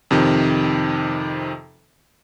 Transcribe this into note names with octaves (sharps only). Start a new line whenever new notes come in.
F2 C3 D#3